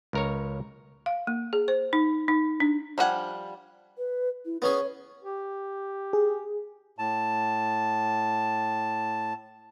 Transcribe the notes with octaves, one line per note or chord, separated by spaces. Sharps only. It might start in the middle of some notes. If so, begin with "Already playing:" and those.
C#2 A#4 C#5
F5
A#3
G#4
C5
D#4
D#4
D4
F3 G3 C4 F#5 G#5
B4
E4
B3 C#4 G#4 C#5
G4
G#4
A2 A5